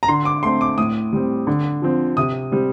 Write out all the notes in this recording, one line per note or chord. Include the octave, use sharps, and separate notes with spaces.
A#5
D3 C6
D6
A3 C4 C6
D6
A2 D#6
G3 C4
D3
F3 C4
C3 D#6
G3 C4